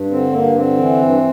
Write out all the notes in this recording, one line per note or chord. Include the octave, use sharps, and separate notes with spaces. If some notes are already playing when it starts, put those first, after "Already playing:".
Already playing: G2
D3 C4
G2 A#3
D3 C4
E3
G2